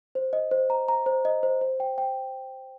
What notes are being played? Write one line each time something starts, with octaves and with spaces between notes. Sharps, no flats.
C5
D#5
C5
A#5
A#5
C5
D#5
C5
C5
G5
G5